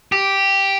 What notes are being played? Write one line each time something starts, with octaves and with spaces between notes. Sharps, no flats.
G4